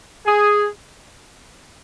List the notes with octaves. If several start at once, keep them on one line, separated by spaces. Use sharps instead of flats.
G#4